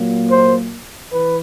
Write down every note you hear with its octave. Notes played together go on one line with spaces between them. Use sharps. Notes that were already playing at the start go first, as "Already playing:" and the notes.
Already playing: A#2 F#3 A#3
C5
E3 B4